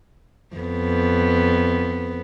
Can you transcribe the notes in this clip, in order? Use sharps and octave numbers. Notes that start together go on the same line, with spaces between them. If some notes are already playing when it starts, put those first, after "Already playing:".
F2 B3